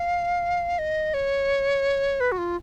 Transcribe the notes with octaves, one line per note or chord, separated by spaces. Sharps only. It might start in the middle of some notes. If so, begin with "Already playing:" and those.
Already playing: F5
D#5
C#5
B4
F#4
F4